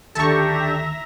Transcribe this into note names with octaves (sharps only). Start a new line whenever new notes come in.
D2 D#3 D4 G4 A4 E5 A#5 C#6